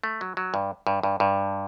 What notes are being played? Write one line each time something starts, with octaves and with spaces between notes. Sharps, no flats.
A3
F#3
F#3
G2
G2
G2
G2